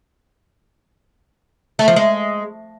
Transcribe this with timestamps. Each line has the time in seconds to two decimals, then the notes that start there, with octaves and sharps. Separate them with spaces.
1.79 A3
1.88 F3
1.96 G#3